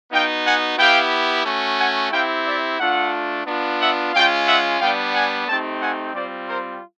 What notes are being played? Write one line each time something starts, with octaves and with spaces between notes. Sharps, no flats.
B3 D#4 F#4 F5 G5
F#5 G#5
B3 E4 G4 F5 G5
A3 C#4 F#4
F#5 G#5
C4 E4 G4 F5 G5
D5 E5
A3 D4 F4 E5 F#5
B3 D4 F4
E5 F#5
G#3 C#4 F4 F5 G5
E5 F#5
G3 B3 D4 F5 G5
F#5 G#5
A3 C4 D#4 G4 G5 A5
F#5 G#5
G3 C4 F4 C5 D5
A#4 C5